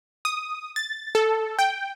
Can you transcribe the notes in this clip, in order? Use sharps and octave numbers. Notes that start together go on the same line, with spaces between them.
D#6
A6
A4
G5